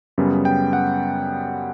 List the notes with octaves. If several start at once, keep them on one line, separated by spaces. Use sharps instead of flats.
F#2 C#3 G3 B3
G5
F#5